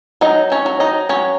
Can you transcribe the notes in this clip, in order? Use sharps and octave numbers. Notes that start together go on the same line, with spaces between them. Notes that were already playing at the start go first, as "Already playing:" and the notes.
F#3 D#4 D#5
C#4 C#5
F#3
D#4 D#5
F#3 C#4 C#5